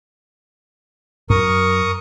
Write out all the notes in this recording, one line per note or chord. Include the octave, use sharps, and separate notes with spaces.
F#2 A#4 C#6 D#6